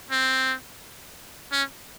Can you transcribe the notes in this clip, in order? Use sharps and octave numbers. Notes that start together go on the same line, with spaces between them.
C4
C#4